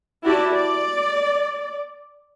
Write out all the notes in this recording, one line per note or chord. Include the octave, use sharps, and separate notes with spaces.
E4 F#4 G4 D5 A5
D5